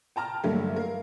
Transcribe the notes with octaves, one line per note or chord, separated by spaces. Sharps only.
G5 A5 A#5 F6
G2 D3 F#3 A3 A#3
A#4 F5